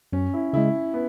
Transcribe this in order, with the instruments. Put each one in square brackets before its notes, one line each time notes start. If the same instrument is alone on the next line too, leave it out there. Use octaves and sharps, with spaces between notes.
[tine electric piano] F#2 [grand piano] C#4
[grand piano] E4
[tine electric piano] C#3 G#3 [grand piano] E4
[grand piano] B3